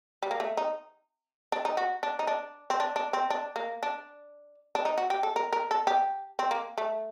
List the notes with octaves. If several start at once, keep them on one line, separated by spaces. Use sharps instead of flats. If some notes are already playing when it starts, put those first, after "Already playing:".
G3
A#3
A3
D#4
D4
D#4
F#4
D4
D#4
D4
C4
D4
D4
C4
D4
A#3
D4
D4
D#4
F#4
G4
A4
A#4
A#4
A4
G4
C4
A#3
A3